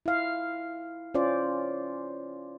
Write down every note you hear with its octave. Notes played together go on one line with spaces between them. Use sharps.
E4 F5
C#4 F4 C5 D5